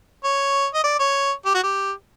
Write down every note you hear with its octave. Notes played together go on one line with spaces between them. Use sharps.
C#5
D#5
D5
C#5
G4
F#4
G4